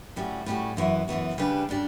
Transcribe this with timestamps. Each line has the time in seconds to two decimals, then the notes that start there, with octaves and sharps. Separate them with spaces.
0.16 A2 G3 C#4 F#4
0.46 A2 G3 C#4 F#4
0.77 F#2 E3 B3 F#4
1.08 F#2 E3 B3 F#4
1.38 C#3 G3 D4 G4 B4
1.69 C#3 G3 D4 G4